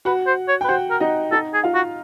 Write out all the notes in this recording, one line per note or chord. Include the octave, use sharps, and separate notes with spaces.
F#4 B4 F#5
C5
C#5
G5
B4
F#4 C5 F#5
A#4
D#4 D#5
D#4 A4 D#5
G#4
F4 F5
F#4